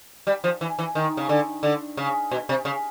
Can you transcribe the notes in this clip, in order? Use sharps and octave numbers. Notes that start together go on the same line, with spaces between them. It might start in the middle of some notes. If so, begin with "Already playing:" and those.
G3
F3
E3
E3
D#3
C#3
D3
D3
C#3
B2
C3
C#3